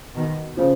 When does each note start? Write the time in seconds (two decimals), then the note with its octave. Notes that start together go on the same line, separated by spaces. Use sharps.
0.15 B2 D#3
0.57 C#3 F3